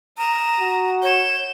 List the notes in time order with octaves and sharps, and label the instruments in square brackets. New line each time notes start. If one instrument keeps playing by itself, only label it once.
[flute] A#5 [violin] D#6 E7
[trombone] F#4
[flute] C#5 [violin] G6 E7